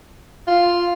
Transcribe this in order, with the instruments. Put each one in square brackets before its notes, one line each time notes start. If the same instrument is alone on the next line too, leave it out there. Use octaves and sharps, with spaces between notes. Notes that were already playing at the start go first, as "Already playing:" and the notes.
[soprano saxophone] F4